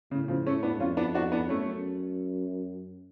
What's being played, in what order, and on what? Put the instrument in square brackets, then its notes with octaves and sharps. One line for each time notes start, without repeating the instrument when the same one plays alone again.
[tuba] A2 [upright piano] C#3
[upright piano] C#3 F3
A3 C#4
B3 D4
[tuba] F2 [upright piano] C#4 F4
[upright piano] B3 D4
D4 F#4
B3 D4
[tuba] F#2 [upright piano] A3 C#4